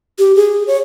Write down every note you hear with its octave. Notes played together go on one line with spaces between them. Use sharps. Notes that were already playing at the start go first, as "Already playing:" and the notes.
G4
G#4
C#5